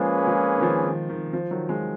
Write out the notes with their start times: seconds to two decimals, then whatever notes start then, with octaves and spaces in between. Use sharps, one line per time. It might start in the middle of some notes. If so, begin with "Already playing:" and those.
Already playing: F3 G#3 A#3 C#4 G#4 B4
0.27 F3 G#3
0.58 D#3
0.62 F3
0.86 D#3
1.09 D#3
1.33 F3
1.51 D#3 F#3
1.69 F3 G#3